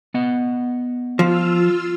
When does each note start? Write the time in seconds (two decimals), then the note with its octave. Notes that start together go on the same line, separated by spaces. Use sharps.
0.14 B3 D#5 F#5
1.19 F3 F4 E6 F6